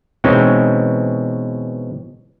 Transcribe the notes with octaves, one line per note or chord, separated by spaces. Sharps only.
B2 E3 G#3 C4 C#4 D#4